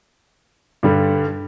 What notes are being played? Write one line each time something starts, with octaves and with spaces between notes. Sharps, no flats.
G2 D3 G3